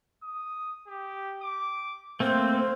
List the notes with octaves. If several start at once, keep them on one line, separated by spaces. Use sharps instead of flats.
D#6
G4
D6
A3 A#3 C4 C5 G6